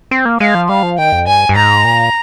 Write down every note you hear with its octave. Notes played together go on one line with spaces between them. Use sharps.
C4
A#3
G#3 F5
F3
G3 F5
F3
D#3 G5
F2
G2 G#5
G2
G#2 A#5
A#2